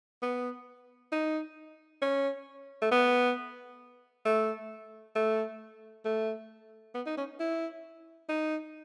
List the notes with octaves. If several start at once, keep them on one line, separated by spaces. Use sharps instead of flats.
B3
D#4
C#4
A3
B3
A3
A3
A3
B3
D#4
C#4
E4
D#4